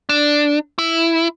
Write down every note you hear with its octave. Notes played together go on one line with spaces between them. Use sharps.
D4
E4